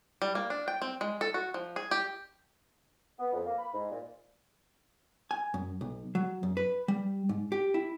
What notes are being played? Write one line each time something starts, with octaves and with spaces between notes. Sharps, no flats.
G3
A#3
D4
G5
C4
G#3
A4
F#4
F3
G#4
G4
B3
F2
A#3
B5
G#2
A#2
G#5
F#2
B1
F#3
F#2
B4
G3
G#2
G4
E4